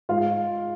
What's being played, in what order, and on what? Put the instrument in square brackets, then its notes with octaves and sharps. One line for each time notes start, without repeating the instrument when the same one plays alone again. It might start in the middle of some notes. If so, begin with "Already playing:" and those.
[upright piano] G#2 F4 F5